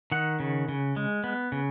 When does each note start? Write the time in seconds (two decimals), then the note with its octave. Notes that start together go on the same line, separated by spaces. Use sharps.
0.12 D#3 F#5
0.40 C#3
0.68 C#3
0.96 G#3
1.24 B3
1.52 C#3